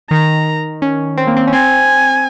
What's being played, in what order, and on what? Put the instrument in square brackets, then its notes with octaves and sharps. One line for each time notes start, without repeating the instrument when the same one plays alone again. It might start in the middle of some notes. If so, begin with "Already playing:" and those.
[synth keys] D#3 [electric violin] A#5
[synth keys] C#4
C4
A#3
C4
C#4
[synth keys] C4 [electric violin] G#5